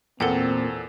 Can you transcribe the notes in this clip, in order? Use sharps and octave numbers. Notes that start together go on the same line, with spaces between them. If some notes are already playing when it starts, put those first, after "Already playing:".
E2 A#2 C4 A4 A#4 F#5 G5